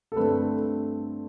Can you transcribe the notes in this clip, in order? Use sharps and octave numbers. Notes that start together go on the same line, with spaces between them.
A4
G2 D3 A3 C4 B4